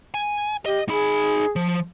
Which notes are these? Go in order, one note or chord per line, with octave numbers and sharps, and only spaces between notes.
G#5
G4 D#5
D#4 G#4 B5
F3